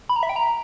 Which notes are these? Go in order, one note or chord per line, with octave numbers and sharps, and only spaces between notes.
B5
A#5
E5
G5
A#5